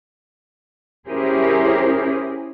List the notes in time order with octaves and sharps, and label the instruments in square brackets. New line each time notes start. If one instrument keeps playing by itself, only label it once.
[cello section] C#4 E4 G4 G#4 A#4 C5